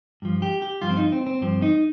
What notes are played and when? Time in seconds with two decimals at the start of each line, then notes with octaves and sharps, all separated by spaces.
0.22 G2 F3
0.42 G4
0.62 G4
0.82 G2 F3 F4
0.90 C4
0.97 D#4
1.12 C4
1.27 C4
1.41 G2 F3 C4
1.62 D#4